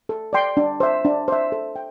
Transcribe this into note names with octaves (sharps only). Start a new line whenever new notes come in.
A4
D5 G5 C6
D4
C5 E5
D4
C5 E5
A4
G5